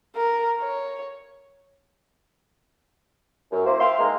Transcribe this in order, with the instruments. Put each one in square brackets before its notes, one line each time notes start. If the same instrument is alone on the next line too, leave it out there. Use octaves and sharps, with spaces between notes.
[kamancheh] A#4
C#5
[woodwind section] F#2
A#3 E4 C5
C5 E5 F5 G5 C6
D#3 G#3 A#3